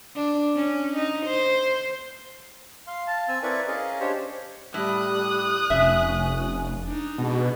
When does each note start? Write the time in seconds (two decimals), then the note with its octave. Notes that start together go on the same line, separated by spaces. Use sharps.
0.16 D4
0.56 C#4
0.96 D#4
1.26 C5
2.87 F5 C6
3.07 F5 A5
3.28 C4 G#5 E6
3.43 C4 E4 A#4 B4 D5 C#6
3.67 C#4 G#4 A#4 D#5 F5
4.00 D4 G4 C5 C#5
4.74 A2 G3 D#6 F#6
5.70 F1 C#4 E5
6.85 D4 D#4
7.18 B2 G#3